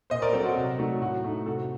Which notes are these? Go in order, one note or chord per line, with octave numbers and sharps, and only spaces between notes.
A#2 C5 D#5
A#4 D5
F#3 C4 A4 C5
F#4 A4
C3
F#3 A3 D#4
A2 F#4
A3 D#4
C3 F#4 A4